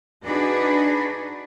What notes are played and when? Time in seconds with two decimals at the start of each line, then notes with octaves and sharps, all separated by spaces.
0.24 D4 D#4 F#4 G#4 B4 D5